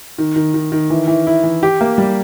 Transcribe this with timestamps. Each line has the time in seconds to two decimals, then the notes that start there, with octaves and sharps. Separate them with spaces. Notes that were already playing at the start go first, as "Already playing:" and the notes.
0.18 D#3
0.36 D#3
0.54 D#3
0.72 D#3
0.90 E3
1.08 E3
1.27 E4
1.44 E3
1.63 G4
1.81 A#3
1.98 G3